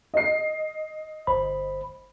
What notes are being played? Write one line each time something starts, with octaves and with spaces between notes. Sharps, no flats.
D#5 C7
G1 C5 B5